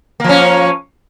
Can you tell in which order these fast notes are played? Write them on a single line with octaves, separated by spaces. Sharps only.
A#3 F3 C#4